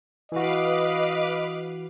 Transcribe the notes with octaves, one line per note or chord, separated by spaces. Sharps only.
E3 F#4 B4 D#5 F5 D6